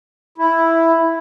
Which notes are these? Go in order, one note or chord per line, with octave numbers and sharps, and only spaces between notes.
E4